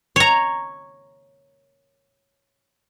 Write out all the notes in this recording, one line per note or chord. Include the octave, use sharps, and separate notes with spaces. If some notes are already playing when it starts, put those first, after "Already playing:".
C#5 A#5